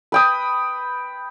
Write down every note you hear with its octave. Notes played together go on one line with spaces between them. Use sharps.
B4 G5 D#6